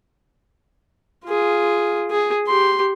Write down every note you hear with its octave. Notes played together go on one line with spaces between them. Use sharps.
F4 G#4
G#4
G4 C6